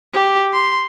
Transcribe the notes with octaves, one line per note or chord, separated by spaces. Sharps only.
G4
C6